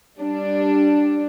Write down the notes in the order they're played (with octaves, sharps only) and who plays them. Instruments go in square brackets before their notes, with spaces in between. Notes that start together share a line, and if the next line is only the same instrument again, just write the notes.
[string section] G3 D4